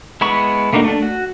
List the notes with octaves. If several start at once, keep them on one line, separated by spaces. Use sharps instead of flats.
G#3 B3 E4 B5 C#6
A3 A#3 D4 D#4 F#4
A3 D4
F#4